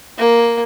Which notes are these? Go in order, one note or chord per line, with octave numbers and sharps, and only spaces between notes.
A#3